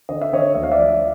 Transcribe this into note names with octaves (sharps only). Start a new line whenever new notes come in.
D3 D#5
E5
D3 C#5 D#5
D2 E5
F5
D5 E5
F3